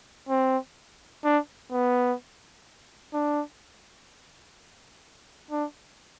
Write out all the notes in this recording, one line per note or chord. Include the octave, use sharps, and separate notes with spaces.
C4
D4
B3
D4
D4